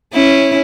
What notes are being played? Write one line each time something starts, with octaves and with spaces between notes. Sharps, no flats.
C#4 E4